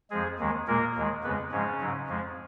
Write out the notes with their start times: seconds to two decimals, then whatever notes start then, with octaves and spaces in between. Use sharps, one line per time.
0.11 F2 F3 G#3 G#4
0.39 D#2 D#3 G#3
0.67 A#2 G#3 A#3 A#4
0.95 D#2 D#3 G#3
1.23 F2 C#3 G#3 B3 B4
1.52 G#2 C#3 F3 G#3 C#4
1.80 G#2 F#3
2.08 F2 F3 G#3